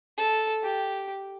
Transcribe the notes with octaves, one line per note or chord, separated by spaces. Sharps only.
A4
G4